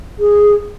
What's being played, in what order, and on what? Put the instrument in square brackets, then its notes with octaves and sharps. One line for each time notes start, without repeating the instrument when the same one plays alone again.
[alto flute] G#4